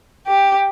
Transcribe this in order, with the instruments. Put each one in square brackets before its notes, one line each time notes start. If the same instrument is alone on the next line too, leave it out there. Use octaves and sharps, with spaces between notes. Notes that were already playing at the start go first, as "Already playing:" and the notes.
[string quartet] G4